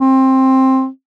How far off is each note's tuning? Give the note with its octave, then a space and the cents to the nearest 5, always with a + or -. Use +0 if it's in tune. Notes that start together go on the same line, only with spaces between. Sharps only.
C4 +15